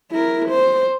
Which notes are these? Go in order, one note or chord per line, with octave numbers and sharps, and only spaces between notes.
E4 A#4
C5